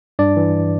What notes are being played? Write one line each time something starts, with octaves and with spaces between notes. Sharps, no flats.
G2 D4 D5
E3